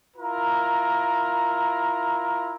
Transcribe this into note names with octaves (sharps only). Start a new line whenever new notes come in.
E4 F4 A#4 A#5